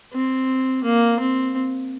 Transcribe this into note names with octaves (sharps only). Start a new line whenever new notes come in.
C4
A#3
C4